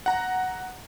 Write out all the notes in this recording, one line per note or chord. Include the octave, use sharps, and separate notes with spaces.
F#5 A#5